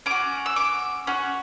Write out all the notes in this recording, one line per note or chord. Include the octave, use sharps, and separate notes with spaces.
C#4 F#4 D6
E6
D6
C#4 F#4